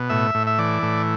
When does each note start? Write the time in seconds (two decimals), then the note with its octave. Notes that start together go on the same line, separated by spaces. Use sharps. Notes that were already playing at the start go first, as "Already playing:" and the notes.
Already playing: B2
0.09 A2 E5
0.35 A2
0.47 E5
0.58 E3 D5
0.82 A2